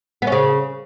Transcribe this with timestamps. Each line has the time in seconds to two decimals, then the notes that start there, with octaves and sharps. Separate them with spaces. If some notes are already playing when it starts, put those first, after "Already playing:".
0.22 B3
0.27 C#4
0.32 C#3